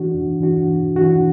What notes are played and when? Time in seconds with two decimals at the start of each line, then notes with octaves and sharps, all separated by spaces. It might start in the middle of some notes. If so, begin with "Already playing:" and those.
Already playing: E3 D4 F#4
0.13 E2
0.40 E3 D4 F#4
0.69 E2
0.96 E3 D4 F#4